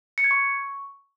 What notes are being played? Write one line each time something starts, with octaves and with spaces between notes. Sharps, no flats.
C#7
G#6
C#6